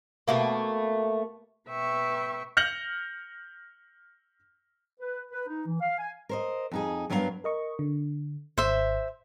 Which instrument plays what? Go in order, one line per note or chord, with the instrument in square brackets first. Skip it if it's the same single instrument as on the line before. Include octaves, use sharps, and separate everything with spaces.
[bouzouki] B2 A3 A#3
[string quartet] B2 B4 E5 G5 C#6
[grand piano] F6 G6 A#6 C#7 F7 F#7
[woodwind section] B4
B4
D#4
E3
F5
G#5
[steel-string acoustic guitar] A#4 C5 D#5
F2 D#4 G#4
G2 F#3 B3 A#4 B4 F5
[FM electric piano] A#4 D#5 C#6
D3
[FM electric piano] G#1 [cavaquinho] C5 E5